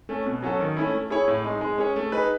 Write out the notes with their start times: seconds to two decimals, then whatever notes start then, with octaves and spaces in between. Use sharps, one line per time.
0.09 A3 C#4
0.26 B2
0.43 F#3 C#4 F#4 A4
0.60 D#3
0.77 A3 C#4 E4
0.93 A3
1.10 E4 G#4 C#5
1.28 A2
1.44 G#3 D#4
1.61 G#3
1.78 C#4 G#4 C#5
1.96 A3
2.12 D#4 G#4 B4